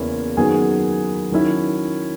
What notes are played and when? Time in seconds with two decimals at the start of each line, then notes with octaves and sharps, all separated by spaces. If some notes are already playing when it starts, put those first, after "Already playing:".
Already playing: E2 C#3 E3 A#3 C#4 E4
0.37 F#2 D#3 F#3 B3 G#4 G#5
1.32 D#3 F#3 C#4 E4